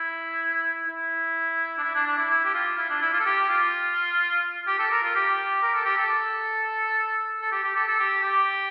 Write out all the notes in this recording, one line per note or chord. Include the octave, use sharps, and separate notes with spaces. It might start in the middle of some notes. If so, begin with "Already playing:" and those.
Already playing: E4
E4
D4
E4
D4
D4
E4
E4
G4
F4
E4
D4
E4
F4
A4
G4
F4
G4
A4
A#4
F4
G4
A#4
A4
G4
A4
A4
G4
G4
A4
A4
G4
G4